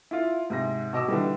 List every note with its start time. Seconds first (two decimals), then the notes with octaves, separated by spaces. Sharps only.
0.11 E4 F4
0.50 G#2 C3 A#6
0.93 B2 D#5 D6 E6
1.08 D3 E3 G3